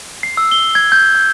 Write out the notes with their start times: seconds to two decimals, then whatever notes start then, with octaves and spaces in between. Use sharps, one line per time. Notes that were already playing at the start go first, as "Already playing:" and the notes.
0.23 C7
0.37 E6
0.52 G7
0.75 G#6
0.92 G6
1.15 G6